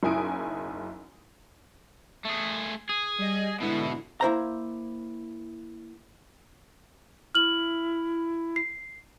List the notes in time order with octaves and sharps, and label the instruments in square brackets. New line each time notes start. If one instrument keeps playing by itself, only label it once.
[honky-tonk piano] F#1 B1 E4 G#5 D#6 D7
[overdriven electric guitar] A3 G#4
G#4
[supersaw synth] G3 D#5
[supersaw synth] G#2 D3 E4 [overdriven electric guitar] B2 B3
[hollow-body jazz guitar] A#3 E4 C5 A#5
[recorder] E4 [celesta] F6 F#7
[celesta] C7